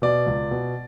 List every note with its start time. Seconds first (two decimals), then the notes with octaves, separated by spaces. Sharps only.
0.02 B2 D5
0.26 C#2
0.51 B2